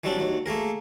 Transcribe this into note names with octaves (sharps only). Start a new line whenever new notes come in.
E3 F#3 G3 C4 D4
D#2 F#3
A3 A#3 G#4 A#4